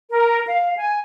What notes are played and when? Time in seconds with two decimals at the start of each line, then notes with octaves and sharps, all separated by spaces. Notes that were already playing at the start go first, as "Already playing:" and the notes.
0.10 A#4
0.47 F5
0.76 G#5